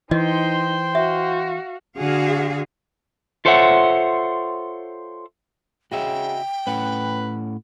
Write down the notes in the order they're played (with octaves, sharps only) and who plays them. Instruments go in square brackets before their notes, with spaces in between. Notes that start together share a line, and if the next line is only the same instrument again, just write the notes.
[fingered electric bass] E3 [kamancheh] D#4 [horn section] C5 G5 C6 [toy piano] D#5
[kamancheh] F#4 F5 [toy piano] E5
[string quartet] D3 [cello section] F#4 G#4 F5
[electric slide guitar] F4 A4 C5 C#5 E5 F#5
[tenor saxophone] C#3 [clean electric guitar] F#4 D#5 E5 [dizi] G5
[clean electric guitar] A2 C#4 F#5 [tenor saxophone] B4